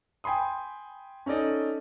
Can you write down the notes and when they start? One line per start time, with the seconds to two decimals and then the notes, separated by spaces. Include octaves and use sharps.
0.24 G5 G#5 B5 C6 D#6
1.26 C#4 D#4 A4 D5 D#5